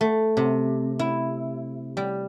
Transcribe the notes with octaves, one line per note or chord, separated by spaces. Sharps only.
A3
C3
E4
G3